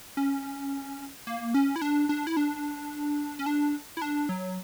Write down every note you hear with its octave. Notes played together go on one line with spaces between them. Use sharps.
C#4
A#3
C#4
E4
D4
D4
E4
D4
C#4
D4
E4
D4
F#3